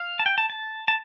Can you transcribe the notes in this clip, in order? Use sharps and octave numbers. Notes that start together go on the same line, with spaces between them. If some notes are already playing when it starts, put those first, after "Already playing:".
Already playing: F5
A5
G5
A5
A5
A5